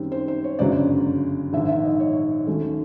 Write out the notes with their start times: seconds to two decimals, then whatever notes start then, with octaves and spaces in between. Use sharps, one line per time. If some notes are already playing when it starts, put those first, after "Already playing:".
Already playing: F#2 D#3 G3 C4
0.12 C5
0.28 C5
0.44 C#5
0.59 G1 F#2 C#3 F#3 D5
1.53 A#1 G#2 D#3 E5
1.69 E5
1.84 D#5
2.00 C#5
2.46 D#2 D#3 F#3 A3 C#4